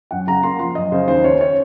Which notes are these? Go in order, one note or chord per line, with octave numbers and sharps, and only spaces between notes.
F#2 F#5
C#3 A#5
A#3 C6
F3 C6
F#2 D#5
C#3 C5
D#2 C5
C#4 C#5
C#5